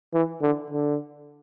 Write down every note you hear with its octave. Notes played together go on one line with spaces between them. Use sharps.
E3
D3
D3